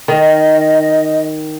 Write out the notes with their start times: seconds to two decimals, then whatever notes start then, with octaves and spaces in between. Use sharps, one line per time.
0.08 D#3 D#5